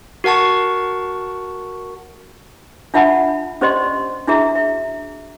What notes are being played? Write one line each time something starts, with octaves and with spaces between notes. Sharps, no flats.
F#4 A#4 F#5 A5 C#6
D4 F4 E5 F#5 A5 B5
C#4 G4 C5 D5 D#5 C6
D4 E4 F#4 G#4 E5 A#5
E5